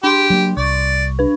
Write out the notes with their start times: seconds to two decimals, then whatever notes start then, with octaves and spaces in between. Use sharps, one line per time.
0.04 D4 G4 C6
0.30 F#3 A#3
0.57 C2 D5 C#6
1.19 D4 B4